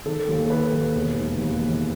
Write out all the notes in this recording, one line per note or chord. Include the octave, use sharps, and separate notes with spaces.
D#3 A4
D#2
A4
D#3 B4
D#2
E1
D#3
D#2
E1